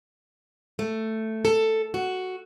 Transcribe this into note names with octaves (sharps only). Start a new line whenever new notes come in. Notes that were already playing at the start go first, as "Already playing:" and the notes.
A3
A4
F#4